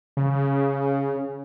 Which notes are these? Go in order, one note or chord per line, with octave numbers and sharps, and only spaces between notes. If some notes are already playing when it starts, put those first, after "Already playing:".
C#3